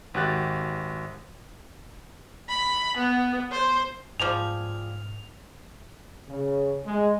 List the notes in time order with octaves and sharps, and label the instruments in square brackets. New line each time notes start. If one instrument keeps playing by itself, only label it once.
[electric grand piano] G#1 F#4 G4 F#6 A6
[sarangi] B5
B3
C5
[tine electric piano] G#2 F6 [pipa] F3 G3 G#4 [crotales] F7
[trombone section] C#3
G#3